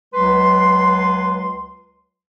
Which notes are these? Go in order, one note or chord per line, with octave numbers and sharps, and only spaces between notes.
C#2 F#3 G#3 B4 C6